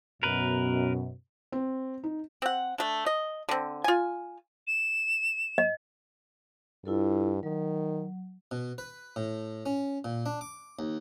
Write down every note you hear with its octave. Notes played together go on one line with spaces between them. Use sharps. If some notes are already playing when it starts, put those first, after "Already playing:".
F#2 B2 A#4 B4
C4
D#4
C4 F#5
A3 D4
D#5
D3 C4
F4 G#5
E7
D#5
G2 E4 F4 A4
D#3 F#3
B2
B4
A2
C#4
A#2
D4
D6
D#2